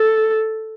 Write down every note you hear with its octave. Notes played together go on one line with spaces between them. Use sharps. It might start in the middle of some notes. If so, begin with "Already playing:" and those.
Already playing: A4